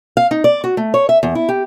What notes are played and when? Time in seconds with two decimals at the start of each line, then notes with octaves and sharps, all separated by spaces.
0.17 F5
0.31 D#4
0.44 D5
0.64 F#4
0.77 A3
0.94 C#5
1.09 E5
1.23 E2
1.35 E4
1.49 G4